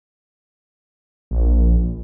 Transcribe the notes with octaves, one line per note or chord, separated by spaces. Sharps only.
A#1